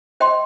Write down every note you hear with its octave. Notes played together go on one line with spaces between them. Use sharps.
C5 D#5 G5 C6